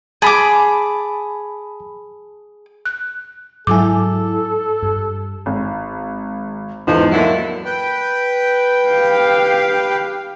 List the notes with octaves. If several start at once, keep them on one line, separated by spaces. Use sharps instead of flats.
G#4 A5 B5 D6
F#6
G#2 F#3 E4 A4 G#5 D6
G2
G#1
E2 G#2 F3 A4 B4 D#5
D3 F#3 A#3 E4 C#5
B4 G5
G4 F5